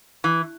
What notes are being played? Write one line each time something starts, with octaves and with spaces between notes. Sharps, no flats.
E3